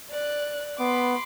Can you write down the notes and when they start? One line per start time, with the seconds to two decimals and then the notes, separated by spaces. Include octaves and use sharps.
0.11 D5 F#6
0.79 B3 B5 C6 D6